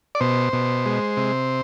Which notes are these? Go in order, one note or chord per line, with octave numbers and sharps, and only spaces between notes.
D5
B2 C5
B2
G#3
C3